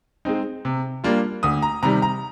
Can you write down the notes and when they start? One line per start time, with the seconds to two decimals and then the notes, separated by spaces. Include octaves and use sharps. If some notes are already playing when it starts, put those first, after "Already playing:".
0.25 G#3 C4 D#4
0.65 C3
1.04 G3 A#3 D4 F4
1.43 D2 D#6
1.62 A#5
1.83 C3 D#3 G3 A#5
2.02 A#5